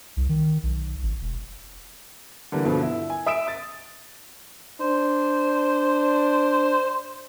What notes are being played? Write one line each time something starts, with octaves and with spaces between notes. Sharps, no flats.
C2
D#3
B1
G#1
E1
D3 E3 G3 A#3
G2 B2 D3 F3
E4
G#5
E5 D#6 E6 D7 E7
D#6 A6
D4 C5